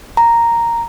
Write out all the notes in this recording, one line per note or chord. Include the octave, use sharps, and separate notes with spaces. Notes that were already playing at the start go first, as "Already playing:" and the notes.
A#5